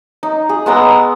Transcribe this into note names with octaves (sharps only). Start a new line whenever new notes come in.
D#4
G#4
G#3 B3 A#5 E6